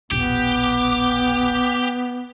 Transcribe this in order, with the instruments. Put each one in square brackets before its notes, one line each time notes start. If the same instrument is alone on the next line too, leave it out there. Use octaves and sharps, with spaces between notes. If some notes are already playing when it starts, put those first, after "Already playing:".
[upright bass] E1 A#1 [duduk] B3 [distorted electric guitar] G4